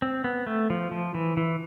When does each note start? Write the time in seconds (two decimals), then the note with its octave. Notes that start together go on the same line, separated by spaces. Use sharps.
0.02 C4
0.24 B3
0.47 A3
0.70 F3
0.91 F3
1.15 E3
1.37 E3